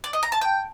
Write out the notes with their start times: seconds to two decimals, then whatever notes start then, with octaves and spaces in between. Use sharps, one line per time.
0.04 D5
0.13 D#5
0.23 A#5
0.32 A5
0.41 G5